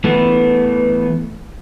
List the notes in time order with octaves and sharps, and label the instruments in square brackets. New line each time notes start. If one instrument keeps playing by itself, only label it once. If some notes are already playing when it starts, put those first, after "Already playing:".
[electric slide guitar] E3 A3 B3